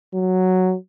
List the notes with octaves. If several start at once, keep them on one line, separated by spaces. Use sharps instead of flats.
F#3